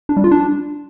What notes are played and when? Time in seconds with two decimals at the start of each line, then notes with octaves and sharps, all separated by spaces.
0.09 D4
0.17 G3
0.24 F4
0.31 D4